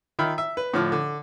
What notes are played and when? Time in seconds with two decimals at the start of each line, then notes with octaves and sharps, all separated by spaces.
0.19 D#3 F4 E5 B5 F6
0.38 E5
0.57 B4
0.74 A2 D3 F3 F6
0.92 D3